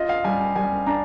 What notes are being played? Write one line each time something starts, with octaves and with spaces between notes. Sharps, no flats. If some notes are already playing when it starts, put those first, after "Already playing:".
Already playing: F4 D#5
F5
G3 G#5
G#5
G3 G#5
D4 A#5